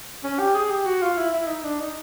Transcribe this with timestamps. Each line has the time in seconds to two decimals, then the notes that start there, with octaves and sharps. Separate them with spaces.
0.24 C#4
0.39 G4
0.55 G#4
0.71 G4
0.86 F#4
1.02 F4
1.17 E4
1.33 E4
1.48 D#4
1.64 D4
1.80 D#4